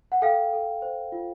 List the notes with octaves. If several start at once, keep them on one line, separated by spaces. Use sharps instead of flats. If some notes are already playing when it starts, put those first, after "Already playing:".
F#5
A4 F5 G5
A4
C5
F4